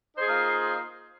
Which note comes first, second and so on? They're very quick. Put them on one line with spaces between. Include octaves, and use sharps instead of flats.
D#4 C5 G#4 A#3 F4